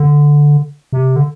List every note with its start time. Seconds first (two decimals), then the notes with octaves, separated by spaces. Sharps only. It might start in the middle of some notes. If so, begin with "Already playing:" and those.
Already playing: D3
0.93 C3
1.16 D3